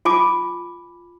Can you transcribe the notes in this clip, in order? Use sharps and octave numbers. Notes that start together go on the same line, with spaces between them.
F4 G#5 A5 B5 D6